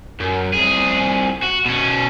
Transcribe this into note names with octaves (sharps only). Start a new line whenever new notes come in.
F#2
C2 G#4
F#4
B2 C#4